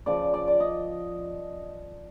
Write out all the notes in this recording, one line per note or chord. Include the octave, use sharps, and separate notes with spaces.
C#3 F3 D5
D5
D5
D#5